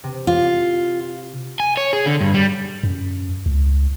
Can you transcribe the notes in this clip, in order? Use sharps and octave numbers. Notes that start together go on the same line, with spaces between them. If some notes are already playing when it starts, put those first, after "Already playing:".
C3
F4
G#5
C#5
G#4
D3
G2
G3
F#2
C#2